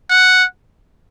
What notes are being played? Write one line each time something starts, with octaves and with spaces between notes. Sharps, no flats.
F#5